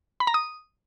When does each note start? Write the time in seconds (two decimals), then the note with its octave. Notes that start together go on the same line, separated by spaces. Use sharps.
0.20 B5
0.27 A#5
0.34 D#6